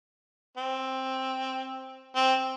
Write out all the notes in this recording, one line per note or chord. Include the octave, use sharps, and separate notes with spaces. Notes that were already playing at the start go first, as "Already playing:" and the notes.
C4
C4